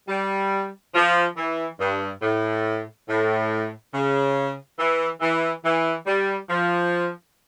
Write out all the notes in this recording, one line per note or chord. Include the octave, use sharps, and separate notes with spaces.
G3
F3
E3
G2
A2
A2
C#3
E3
E3
E3
G3
F3